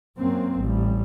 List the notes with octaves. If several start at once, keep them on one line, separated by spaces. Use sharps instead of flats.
F#2 A#3 C4
A1 G3